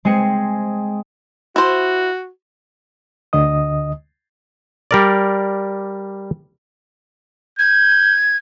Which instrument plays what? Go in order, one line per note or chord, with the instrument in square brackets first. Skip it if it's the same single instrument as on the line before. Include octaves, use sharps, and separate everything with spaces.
[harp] G#3 C4 G#4 G5 A#6 C#7
[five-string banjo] E4 C5 [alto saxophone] F#4
[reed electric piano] D2 D3 D#5 D#6
[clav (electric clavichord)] G3 A#4 D5
[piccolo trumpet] G6 [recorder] G#6